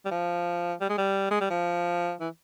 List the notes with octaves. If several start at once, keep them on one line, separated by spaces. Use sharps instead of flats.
G3
F3
G3
G#3
G3
G#3
G3
F3
E3